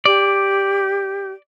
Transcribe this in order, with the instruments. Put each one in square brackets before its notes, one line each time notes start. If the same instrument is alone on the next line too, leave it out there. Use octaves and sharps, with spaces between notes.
[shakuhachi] G4 [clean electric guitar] D5